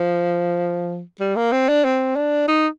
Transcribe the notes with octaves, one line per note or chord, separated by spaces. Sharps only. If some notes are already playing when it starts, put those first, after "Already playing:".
Already playing: F3
G3
A#3
C4
D4
C4
D4
D#4